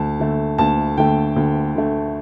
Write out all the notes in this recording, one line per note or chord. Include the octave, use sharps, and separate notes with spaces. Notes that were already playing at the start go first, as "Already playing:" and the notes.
Already playing: D2 A5
D3 A3
D2 A5
D3 A3 G5
D2
D3 A3